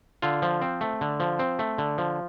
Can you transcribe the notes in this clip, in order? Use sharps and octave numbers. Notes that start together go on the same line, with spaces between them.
D3 F4
F3
C4
A3
D3
F3
C4
A3
D3
F3